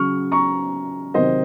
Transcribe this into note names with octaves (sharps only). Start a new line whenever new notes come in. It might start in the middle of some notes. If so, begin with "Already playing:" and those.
Already playing: C#3 F#3 C#6 F6
A#5 C#6
C3 D#3 F#3 C5 D#5